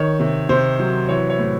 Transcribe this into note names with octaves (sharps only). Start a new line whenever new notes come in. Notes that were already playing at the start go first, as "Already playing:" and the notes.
Already playing: D#3 C#5
C3
C3 C5
F#3
E3 C#5
C#5
A2